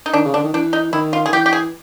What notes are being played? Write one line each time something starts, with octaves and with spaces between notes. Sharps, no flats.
D#4
D#3 D4
C#3
D3 D4
D#3
E3 D4
D#4
D#3 E4
F4
G#4
D#3
E3 G4
G4
G#4